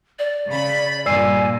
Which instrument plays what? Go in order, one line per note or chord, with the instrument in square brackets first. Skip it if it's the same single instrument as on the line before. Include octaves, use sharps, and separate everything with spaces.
[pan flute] D5
[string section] C#3 B5
[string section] G2 A#2 [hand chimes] D5 E6 C7 [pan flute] G#5